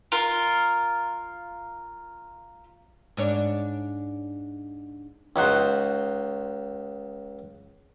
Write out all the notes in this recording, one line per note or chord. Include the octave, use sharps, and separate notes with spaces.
F4 A#4
G#2 D4 C#5
C#2 D#4 F#4 C5